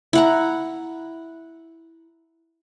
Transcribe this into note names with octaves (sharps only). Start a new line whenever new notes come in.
E4 F#5 A#5